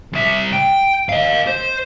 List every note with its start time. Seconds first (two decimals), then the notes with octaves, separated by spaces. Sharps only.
0.13 C2 E5
0.52 G5
1.09 D#5 F5
1.47 C5